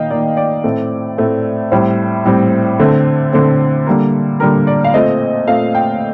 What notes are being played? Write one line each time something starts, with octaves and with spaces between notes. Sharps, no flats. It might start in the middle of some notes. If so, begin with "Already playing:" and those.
Already playing: D#3 A#3 D#5 F5 G5
D#3 A#3 D5
D5
A2 A3 C4
A2 A3 C4
A2 G3 C4 C5
A2 G3 C4
D3 A3 C4
D3 A3 C4
D3 G3 A#3
D3 G3 A#3 A#4
D5
F5
A#2 A3 C4 D#5
A#2 A3 C4 F5
G5